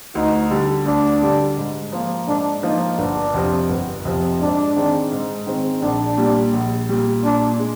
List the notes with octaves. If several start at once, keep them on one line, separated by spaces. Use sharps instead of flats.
D2 D#4
D3 G3
D2 D4
D3 G3
G#2
F3 A#3 F4
G#2 D4
F3 A#3 D#4 F4
G1 D4
F2 C3 F3
G1
F2 C3 F3
G#2 D4
D#3 G#3 C4
G#2
D#3 G#3 C4
A#1 D4
A#2 G3
A#1
A#2 G3
A#2 D4
G#3